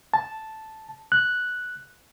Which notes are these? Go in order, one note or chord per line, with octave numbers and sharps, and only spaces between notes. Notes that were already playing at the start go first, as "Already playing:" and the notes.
A5
F#6